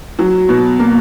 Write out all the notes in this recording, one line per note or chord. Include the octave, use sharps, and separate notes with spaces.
F#3
B2
A#3